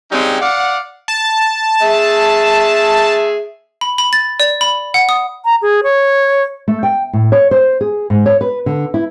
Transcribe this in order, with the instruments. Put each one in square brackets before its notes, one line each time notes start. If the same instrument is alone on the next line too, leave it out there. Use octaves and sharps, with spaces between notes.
[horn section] C#3 G3 G#3 C4 C#4 D#4
D5 F5 F#5
[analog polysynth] A5
[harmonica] G#4 E5
[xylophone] B5
B5
A6
D5
B5
F#5
D#6
[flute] A#5
G#4
C#5
[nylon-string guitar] A3
G5
A2
C#5
C5
G#4
G#2
C#5
B4
D3
E4